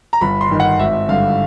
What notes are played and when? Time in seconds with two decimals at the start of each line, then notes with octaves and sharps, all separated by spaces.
0.13 A#5
0.21 G1 B5
0.41 C6
0.50 G2 D#3
0.60 F#5
0.79 G#1 E5
1.09 G2 D3 F5